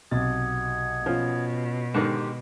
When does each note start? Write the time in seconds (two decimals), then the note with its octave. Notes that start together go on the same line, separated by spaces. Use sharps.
0.11 B1 C3 F#5 D#6 G#6 A6
1.06 B2 F3 C#4 F4
1.94 G#2 D3 D#3 G4 C6 D6